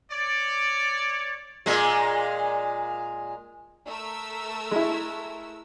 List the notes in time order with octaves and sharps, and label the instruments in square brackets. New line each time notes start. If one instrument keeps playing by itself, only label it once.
[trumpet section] C#5 D5
[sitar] A#2 G#3
[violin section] A3 A#4 E6
[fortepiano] G#3 E4